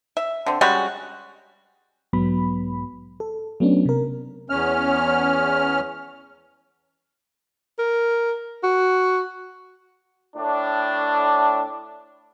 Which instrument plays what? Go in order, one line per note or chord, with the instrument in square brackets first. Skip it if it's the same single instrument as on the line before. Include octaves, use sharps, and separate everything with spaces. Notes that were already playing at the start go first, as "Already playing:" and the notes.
[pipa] E5
D3 C4
G3 G#3 C#4 F#4
[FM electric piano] B1 G#2 F#3 B3 B5
A4
F#3 A3 B3 C#4 D4
C3 A#4
[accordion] E2 C#4 F6
[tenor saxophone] A#4
F#4
[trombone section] A2 D4